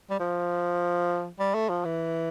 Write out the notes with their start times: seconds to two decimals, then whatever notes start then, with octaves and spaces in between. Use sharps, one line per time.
0.10 G3
0.20 F3
1.39 G3
1.55 A3
1.69 F3
1.85 E3